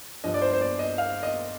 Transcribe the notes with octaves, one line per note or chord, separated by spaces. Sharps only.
G2 F3 D#5
D5
C5
C5
D5
D#5
F5
D#5